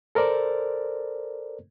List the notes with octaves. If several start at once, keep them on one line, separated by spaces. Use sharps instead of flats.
A4 A#4 C5 D5